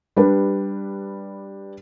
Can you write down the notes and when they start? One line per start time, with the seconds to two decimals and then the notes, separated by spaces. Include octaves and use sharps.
0.16 G3 D4 G4 B4